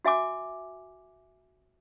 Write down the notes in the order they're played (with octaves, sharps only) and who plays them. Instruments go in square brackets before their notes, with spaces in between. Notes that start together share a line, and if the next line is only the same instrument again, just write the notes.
[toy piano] F#4 E5 G#5 D6